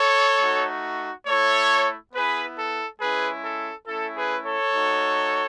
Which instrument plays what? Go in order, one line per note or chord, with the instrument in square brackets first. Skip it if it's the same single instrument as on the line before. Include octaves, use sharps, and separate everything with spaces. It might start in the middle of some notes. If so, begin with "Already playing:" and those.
Already playing: [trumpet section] A4 C#5
A3 D#4 F#4
A3 E4 A4 C#5
B3 E4 G#4 B4
A4
G#3 C#4 E4 G#4 B4
A4
A3 C#4 E4 A4
G#4 B4
A4 C#5
A3 D#4 F#4